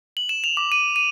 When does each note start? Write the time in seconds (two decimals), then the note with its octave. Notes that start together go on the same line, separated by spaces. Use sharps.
0.17 F#7
0.29 E7
0.44 F7
0.57 D6
0.72 D#7
0.96 D#7